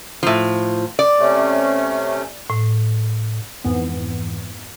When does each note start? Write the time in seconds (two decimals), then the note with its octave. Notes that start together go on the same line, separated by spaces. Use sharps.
0.23 A2 F3
0.99 D5
1.19 C3 A3 C#4
2.50 A2
3.64 F2 G#2 E3 B3